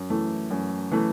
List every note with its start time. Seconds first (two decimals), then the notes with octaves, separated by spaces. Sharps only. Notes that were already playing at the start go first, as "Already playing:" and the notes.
Already playing: F#2
0.10 E3 A3
0.50 F#2
0.91 E3 A3